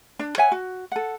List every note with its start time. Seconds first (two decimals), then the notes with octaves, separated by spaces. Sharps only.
0.19 D4
0.38 C#5 E5 F#5 G#5
0.52 F#4
0.92 A4 F#5